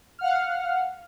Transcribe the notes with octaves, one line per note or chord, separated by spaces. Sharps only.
F5 F#5 F6